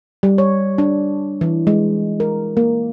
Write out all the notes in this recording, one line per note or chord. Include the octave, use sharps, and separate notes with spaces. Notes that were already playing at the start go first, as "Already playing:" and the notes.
G3
C#5
D4
E3
G#3
A#4
A#3